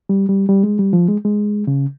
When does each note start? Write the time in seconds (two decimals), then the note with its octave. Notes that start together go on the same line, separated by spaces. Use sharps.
0.09 G3
0.29 G3
0.49 G3
0.64 G#3
0.79 G3
0.93 F3
1.08 G#3
1.25 G#3
1.67 C#3